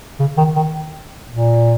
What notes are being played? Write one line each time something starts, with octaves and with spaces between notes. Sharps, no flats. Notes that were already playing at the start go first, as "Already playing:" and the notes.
C#3
D#3
D#3
A#2